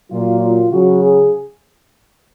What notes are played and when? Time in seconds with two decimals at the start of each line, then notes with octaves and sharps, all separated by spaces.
0.10 A#2 F#3 F4
0.41 F4
0.72 C#3 F#3 F#4
1.03 G#4